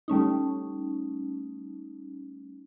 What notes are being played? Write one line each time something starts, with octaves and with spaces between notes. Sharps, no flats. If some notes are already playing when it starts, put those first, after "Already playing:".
G3 A3 C#4 D#4